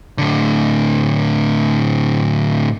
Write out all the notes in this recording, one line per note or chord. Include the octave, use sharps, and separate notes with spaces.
A2 D3